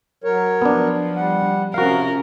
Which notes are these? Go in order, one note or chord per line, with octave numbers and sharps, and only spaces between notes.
F#3 A#4 C#5
F3 B3 D4
G3 F#5
C3 F3 C#4 F#4 A#4 F5